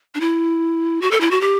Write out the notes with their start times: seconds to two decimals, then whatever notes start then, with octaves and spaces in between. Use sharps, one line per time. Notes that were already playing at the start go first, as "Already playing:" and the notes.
0.15 D4
0.20 E4
1.01 F#4
1.11 A4
1.21 E4
1.31 F#4
1.41 G4